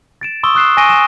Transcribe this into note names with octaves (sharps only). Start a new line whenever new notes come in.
A6 D7 E7
C6 C#6 D#6 E6 G7
D#6 F#6 C7 E7
G#5 C#6 A#6 D7 D#7 G7
D#6 E7